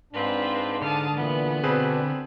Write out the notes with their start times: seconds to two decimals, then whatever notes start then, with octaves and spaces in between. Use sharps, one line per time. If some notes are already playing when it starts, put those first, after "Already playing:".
0.13 G#2 C4 D4 F4 B4
0.82 D3 A5 D#6 F6
1.16 A#2 E3 B3
1.63 B2 C4 D4 G#4 B4